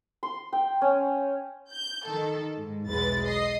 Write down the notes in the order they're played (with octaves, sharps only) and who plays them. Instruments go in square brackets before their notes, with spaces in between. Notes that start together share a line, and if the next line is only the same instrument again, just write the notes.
[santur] C6
G5
C#4
[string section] G6
D#3 A4
G#2
B1 E2 G#3 B4 A6
D#5 C7